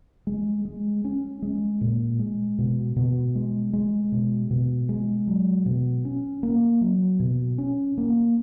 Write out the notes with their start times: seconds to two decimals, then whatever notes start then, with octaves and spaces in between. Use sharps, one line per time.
0.27 G#3
0.65 G#3
1.04 C#4
1.42 G#3
1.81 A#2
2.19 G#3
2.59 B2
2.96 B2
3.35 G#3
3.73 G#3
4.12 B2
4.51 B2
4.89 G#3
5.27 F#3
5.66 B2
6.05 C#4
6.43 A#3
6.81 F#3
7.20 B2
7.58 C#4
7.98 A#3